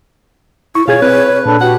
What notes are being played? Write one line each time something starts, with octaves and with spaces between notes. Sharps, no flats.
E4 C#6
B2 F4 G#4 C#5 G#6
C4 B4
A#2 D4 A4 B4
F#4 G4 F#5